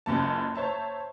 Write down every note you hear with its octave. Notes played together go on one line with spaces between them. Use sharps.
F#1 C#2 F#2 A5
C5 C#5 E5 A5 A#5